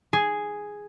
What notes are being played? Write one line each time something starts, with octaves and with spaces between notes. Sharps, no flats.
G#4